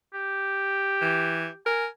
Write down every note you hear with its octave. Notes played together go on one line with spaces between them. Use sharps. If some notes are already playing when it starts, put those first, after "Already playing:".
G4
E3
A#4 G#5